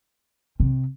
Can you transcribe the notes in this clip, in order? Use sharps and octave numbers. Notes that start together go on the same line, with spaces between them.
C3